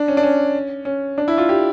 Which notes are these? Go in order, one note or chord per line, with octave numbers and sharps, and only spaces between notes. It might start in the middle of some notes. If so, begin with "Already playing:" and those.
Already playing: D4
C#4
D4
C#4
C#4
D4
E4
F4
G4